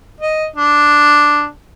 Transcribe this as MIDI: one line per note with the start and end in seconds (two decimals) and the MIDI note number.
0.20 0.46 75
0.56 1.47 62